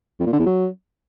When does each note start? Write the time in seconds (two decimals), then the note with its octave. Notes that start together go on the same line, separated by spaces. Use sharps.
0.20 F2
0.26 A#2
0.33 D3
0.39 E2
0.46 F#3